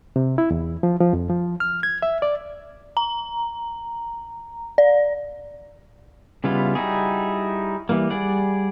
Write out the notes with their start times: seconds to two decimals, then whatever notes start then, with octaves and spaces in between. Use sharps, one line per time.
0.16 C3
0.38 E4
0.51 E2
0.83 F3
1.00 F3
1.13 F2
1.30 F3
1.60 F6
1.83 G#6
2.02 E5
2.22 D5
2.97 A#5
4.78 D5
6.44 C#3 G3 B3 E4 F4
6.75 G3 D#4 E4 F#4 G#4
7.89 E3 G3 A#3
8.10 G3 G#4 D5 F#5